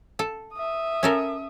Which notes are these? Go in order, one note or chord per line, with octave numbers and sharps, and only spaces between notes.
A4
E5 D#6
C#4 A4 A#4